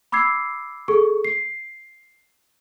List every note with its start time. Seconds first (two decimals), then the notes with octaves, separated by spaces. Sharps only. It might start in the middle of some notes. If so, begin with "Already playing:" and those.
0.12 B5 D6 E6 G#6 C7
0.88 G#4 A4 C#6
1.25 C7